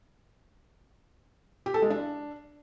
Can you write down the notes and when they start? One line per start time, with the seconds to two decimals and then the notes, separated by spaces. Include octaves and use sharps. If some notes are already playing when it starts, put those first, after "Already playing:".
1.66 G4
1.74 A4
1.82 G#3
1.90 D4